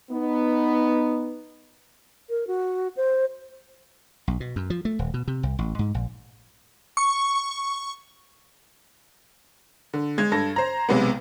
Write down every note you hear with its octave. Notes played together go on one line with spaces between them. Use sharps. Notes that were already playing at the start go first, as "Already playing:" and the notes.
B3 D#4
A#4
F#4
C5
B1
B2
F#2
F3
A3
D#1
B2
C3
C2
A1
G#2
A#1
C#6
D3
G#3 G#6
G2 A4 A#6
C5 A#5
B1 C3 G#3 B3